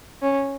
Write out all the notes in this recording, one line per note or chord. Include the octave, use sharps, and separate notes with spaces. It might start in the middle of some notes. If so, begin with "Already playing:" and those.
C#4